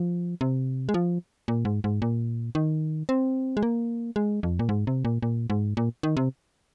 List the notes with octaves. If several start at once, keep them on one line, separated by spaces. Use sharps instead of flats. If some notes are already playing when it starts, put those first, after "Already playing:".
Already playing: F3
C3
G#3
F3
A#2
G#2
G#2
A#2
D#3
C4
G#3
A#3
G#3
F2
A#2
G#2
C3
A#2
A#2
G#2
A#2
D#3
C3